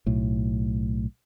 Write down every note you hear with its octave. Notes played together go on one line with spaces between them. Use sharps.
B1 A2